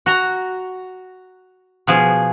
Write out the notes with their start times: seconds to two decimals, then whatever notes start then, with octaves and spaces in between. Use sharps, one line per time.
0.06 F#4 A#5
1.87 B2 F3 G#4